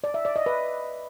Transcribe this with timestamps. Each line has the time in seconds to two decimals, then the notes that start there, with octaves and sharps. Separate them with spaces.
0.04 D5
0.14 E5
0.25 D5
0.36 D#5
0.46 B4